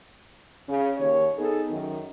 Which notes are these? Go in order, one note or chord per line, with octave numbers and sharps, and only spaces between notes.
C#3
D#2 C#5
B3 D#4 G#4 A4
F#2 D#3